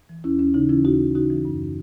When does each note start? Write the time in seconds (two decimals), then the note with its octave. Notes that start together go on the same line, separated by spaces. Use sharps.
0.09 E3
0.24 D#2 C#4 E4
0.39 D#2 C#4
0.54 C#3 D#4
0.69 E3 C#4 E4
0.85 D#2 D#4 F#4
1.00 D#2
1.15 C#3 D#4 F#4
1.30 E3
1.45 F#2